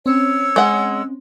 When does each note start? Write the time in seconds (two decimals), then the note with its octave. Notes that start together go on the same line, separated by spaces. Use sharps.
0.06 C4 C#4 C#5 E6
0.56 G#3 F#5